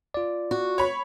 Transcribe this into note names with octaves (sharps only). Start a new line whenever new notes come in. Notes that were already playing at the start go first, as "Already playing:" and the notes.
F4 D5
F#4
C#5 B5